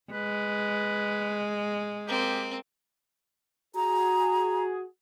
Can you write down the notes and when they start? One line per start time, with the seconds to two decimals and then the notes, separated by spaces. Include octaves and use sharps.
0.12 G#3 B4
2.07 A#3 C4 G4
3.76 F#4 G#4 A#5